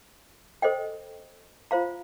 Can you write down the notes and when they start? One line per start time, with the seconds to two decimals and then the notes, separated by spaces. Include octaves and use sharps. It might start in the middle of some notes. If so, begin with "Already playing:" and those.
0.62 A4 C5 D#5 G5
1.71 F4 C5 F5 A#5